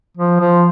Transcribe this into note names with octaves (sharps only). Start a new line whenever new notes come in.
F3
F3